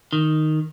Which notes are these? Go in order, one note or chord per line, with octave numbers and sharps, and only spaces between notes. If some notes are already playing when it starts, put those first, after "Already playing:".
D#3